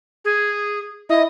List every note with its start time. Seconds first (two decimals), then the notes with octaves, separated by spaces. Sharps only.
0.25 G#4
1.09 E4 D#5